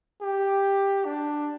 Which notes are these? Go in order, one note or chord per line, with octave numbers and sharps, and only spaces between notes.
G4
D4